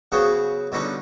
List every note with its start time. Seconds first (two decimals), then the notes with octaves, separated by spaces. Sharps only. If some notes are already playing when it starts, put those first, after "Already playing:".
0.12 C#3 F#3 B3 G#4 C5 C#5
0.72 B2 D3 G3 C#4 D#4